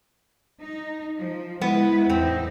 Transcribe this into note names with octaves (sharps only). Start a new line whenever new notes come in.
D#4
F3
G#3 B3 E4 B4
E2 A2 C4 D#4